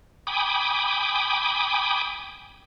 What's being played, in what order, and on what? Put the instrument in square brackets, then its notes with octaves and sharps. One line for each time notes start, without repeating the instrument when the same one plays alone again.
[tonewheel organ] G5 G#5 B5 D6 D#6